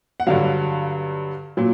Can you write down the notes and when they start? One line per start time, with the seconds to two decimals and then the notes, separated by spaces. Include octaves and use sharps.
0.20 F#5
0.27 G2 D3 F#3 F5
1.57 A#2 F#3